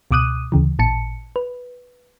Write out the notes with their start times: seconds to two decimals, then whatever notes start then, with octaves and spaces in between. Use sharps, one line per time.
0.11 C#2 B2 D6 D#6 F#6 D#7
0.52 D2 C#3 E3
0.79 A1 A#2 A5 C#7
1.36 B4